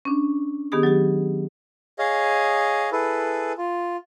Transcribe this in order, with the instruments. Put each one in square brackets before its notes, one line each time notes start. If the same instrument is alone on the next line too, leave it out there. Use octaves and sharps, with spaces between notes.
[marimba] C#4 D4
D#3 B3 G4 G#4 D#6
F#3 G4
[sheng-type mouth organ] G#4 C#5 D#5 F5
E4 G#4 A4 B4
F4